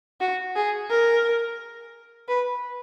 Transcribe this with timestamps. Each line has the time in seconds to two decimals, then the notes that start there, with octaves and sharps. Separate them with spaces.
0.21 F#4
0.56 G#4
0.90 A#4
2.28 B4